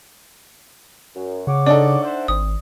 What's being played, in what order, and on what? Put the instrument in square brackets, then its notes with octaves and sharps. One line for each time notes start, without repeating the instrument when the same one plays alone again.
[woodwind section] F#2
[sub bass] C#3 [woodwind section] C#5 F#5 D6
[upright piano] D4 D#4 A4 [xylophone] D5
[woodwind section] C5 E5 F#5
[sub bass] G#1 [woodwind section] C4 [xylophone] D#6